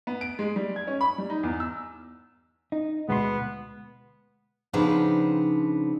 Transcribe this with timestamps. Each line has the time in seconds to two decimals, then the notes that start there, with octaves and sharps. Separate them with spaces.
0.07 B3
0.21 D7
0.39 G#3
0.56 G3
0.76 G#6
0.87 C#4
1.01 B5
1.18 G3
1.30 D#4
1.43 E2
1.60 E6
2.72 D#4
3.09 D2 B2 G#3 B3 C6
4.73 C#3 F3 B3 C4 D4 D#4